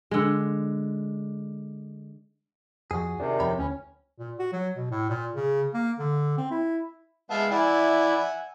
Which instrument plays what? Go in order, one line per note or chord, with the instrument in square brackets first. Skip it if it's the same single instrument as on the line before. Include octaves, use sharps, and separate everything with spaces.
[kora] D3 G#3
[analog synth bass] F2 [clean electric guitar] F#4 G#4
[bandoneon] C3 D#3 [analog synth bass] D4
[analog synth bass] F2 [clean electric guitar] C#5 G5 B5
[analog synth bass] D2 [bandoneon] C#4
[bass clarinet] A#2
F#4
F#3
B2
A2
A#2
C#3
A#3
D3
C4
E4
[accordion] G#3 F5 [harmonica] B3 E5 A5
[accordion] E4 D5 [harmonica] E5 F#5 G#5